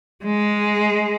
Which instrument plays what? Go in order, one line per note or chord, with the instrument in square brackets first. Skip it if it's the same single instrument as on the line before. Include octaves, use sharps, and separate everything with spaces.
[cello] G#3